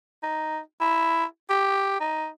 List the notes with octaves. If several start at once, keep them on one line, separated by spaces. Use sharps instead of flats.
D#4
E4
G4
D#4